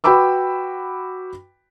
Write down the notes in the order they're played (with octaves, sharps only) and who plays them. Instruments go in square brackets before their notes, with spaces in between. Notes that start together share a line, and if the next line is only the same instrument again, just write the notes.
[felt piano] F#4 B4 G5 B5 D6 E6